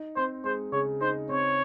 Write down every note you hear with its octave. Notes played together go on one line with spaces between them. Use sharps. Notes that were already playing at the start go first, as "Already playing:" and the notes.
Already playing: D#4
C4 C5
G#3 C5
C#3 C#5
D#4 C5
C4 C#5